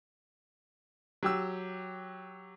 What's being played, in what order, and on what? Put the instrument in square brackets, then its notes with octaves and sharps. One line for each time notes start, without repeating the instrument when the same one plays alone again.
[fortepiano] F#3 G4 E6